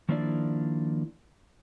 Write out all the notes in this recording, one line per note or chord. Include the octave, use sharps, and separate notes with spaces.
D#3 F3 A#3 D4 E4 D5